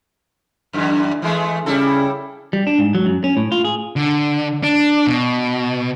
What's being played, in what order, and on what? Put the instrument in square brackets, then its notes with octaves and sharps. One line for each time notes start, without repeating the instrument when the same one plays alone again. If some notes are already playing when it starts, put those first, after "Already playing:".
[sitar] F#2 D3 E3
E3 G#3 A3
[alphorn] C#3 [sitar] G3 E4 A4
[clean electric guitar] G3
D4
G#2
F#3
F#2
C#4
A2
F4
G#4
[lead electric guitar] D3
D4
B2